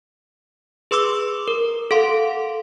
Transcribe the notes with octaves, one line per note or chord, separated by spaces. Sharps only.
G#4 B4 C6 D6 E6
A#4
A4 F5 F#5 C6